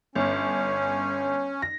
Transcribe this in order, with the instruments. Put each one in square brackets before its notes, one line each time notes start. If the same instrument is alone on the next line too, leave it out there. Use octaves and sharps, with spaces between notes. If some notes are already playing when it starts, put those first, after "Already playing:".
[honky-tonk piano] G1 [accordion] C#4
[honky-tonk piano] A#6